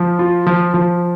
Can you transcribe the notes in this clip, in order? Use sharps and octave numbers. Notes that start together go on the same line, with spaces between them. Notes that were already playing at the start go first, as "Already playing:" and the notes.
Already playing: F3
F4
F3
F3